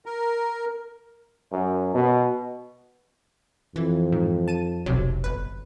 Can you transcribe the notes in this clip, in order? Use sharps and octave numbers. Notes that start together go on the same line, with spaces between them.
A#4
F#2
B2
F2 E3
G#2
A5 D#7
F1 B1 C3 F#3
G1 B4